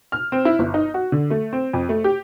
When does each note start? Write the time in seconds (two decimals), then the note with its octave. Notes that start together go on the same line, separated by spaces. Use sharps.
0.12 F6
0.32 C4
0.45 E4
0.59 G1
0.74 D#4
0.94 F#4
1.12 D3
1.30 A3
1.53 C4
1.73 F2
1.89 A3
2.04 G4